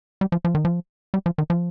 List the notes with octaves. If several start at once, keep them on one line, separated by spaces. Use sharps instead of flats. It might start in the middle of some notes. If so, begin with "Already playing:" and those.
G3
F3
F3
D#3
F3
G3
F3
D#3
F3